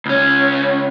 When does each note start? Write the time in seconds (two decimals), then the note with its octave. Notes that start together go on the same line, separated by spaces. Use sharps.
0.06 C#2 C#4